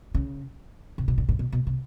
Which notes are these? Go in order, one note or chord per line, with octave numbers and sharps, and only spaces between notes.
C#3
C3
B2
A#2
A#2
B2
B2
C3